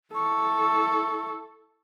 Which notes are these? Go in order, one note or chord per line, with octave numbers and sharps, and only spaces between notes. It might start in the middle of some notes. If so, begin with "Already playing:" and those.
E4 A4 C#6